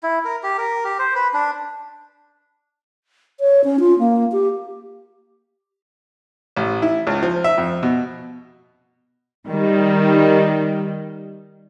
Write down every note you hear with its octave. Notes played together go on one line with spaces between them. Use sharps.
E4
A#4
G4
A#4
G4
C5
B4
D4
C#5
C#4
F4
A#3
G4
A1
E4
C#2
F3
E5
F2
B2
D#3 G3